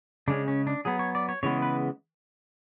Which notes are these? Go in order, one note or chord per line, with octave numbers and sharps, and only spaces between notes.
C#3 G#3 C#4 D4
C#4
D4
F#3 B3 G#4
C#5
D5
C#5
C#3 E3 G#3 B3 C#5
B4